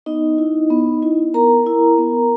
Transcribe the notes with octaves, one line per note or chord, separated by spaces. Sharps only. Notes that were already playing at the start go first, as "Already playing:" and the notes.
B3 D#4 D#5
E4
B3
E4
B3 A#4 A#5
E4
B3